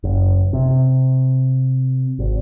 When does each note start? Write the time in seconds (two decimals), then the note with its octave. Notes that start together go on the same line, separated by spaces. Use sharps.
0.03 F#1
0.53 C3
2.19 G#1